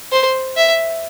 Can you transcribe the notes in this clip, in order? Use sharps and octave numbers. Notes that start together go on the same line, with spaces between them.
C5
E5